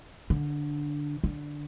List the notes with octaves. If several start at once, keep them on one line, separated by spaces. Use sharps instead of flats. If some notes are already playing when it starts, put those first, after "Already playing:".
D3
D3